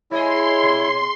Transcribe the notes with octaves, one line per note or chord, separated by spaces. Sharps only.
G3 E4 G#4 C#5 D#5 C6
B2